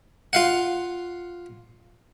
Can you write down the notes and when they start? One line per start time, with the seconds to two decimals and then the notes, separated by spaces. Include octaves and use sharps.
0.33 F4 F5 F#5